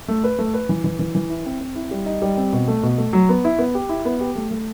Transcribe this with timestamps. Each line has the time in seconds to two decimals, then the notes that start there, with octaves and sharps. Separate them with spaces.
0.08 A3
0.24 B4
0.39 A3
0.54 B4
0.69 E3
0.84 E3
0.99 E3
1.15 E3
1.30 E4
1.46 C4
1.61 C4
1.75 E4
1.91 G3
2.06 D#4
2.22 G3
2.37 C4
2.53 B2
2.68 A3
2.83 B2
2.98 A3
3.13 F#3
3.29 B3
3.44 E4
3.59 B3
3.75 G4
3.89 E4
4.05 B3
4.20 G4
4.36 A3
4.51 A3